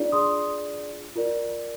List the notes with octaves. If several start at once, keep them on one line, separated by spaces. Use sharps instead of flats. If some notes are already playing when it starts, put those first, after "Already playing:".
Already playing: D4 F4 G#4 D5
C6 D#6
F4 A#4 D5